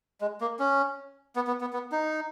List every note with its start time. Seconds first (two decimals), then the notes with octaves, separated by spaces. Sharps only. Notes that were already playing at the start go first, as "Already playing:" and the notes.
0.21 G#3
0.41 A#3
0.59 C#4
1.36 B3
1.47 B3
1.61 B3
1.73 B3
1.92 D#4